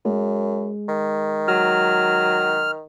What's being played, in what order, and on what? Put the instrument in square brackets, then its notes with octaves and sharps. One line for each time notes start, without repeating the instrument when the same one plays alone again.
[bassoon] F#2 [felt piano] G#3
[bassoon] D#3
[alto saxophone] F#3 [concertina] F6